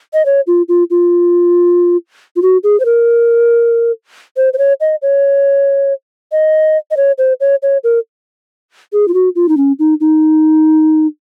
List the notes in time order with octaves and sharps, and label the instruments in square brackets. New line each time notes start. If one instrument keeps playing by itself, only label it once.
[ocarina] D#5
C#5
F4
F4
F4
F4
F#4
G#4
C5
A#4
C5
C5
C#5
D#5
C#5
D#5
D#5
C#5
C5
C#5
C#5
A#4
G#4
F4
F#4
F4
D#4
C#4
D#4
D#4